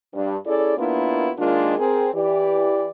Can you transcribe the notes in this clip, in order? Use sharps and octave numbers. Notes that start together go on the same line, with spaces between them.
G2
C#4 E4 G#4 A4 D5
D#2 A#3 B3 D4 E4 F4
D#3 G#3 A#3 D4 F4
C4 G#4 A#4
E3 G4 D5